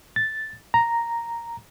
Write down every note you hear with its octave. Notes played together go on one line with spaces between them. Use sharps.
A6
A#5